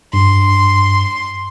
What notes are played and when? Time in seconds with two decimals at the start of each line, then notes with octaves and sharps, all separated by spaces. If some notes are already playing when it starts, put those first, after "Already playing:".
0.13 G2 C6